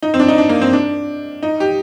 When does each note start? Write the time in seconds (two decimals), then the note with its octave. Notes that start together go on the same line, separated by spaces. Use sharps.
0.02 D#4
0.14 C4
0.19 D4
0.28 D#4
0.38 D4
0.49 A#3
0.61 C4
0.73 D4
1.43 D#4
1.60 G4